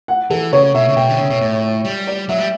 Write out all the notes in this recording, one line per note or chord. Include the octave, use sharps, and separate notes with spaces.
F#5
E3 A4
C#3 C#5
B2 E5
C#3
B2 G5
D3
C#3
B2
A2
G3
D5
F#3 E5
G3